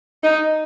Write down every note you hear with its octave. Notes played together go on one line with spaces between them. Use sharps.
D#4